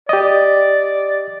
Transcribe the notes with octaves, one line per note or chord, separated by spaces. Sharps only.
G4 D5 D#5